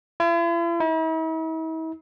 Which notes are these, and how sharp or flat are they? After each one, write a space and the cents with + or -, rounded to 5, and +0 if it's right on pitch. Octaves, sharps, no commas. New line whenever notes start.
E4 +45
E4 -45